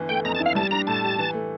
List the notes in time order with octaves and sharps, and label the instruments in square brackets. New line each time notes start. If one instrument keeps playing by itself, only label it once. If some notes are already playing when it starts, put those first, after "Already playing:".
Already playing: [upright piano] G1 E3
[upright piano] A3 [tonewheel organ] G5
[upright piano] F2 [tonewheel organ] A#5
[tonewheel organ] A5
[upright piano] E4
[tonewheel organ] F5
[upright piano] G3 [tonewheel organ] A5
[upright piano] D4 [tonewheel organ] A#5
[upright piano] A2 [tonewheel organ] A5
[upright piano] G4
E3
A3